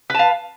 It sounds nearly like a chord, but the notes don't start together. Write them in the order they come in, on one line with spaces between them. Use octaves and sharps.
B4 A5 F5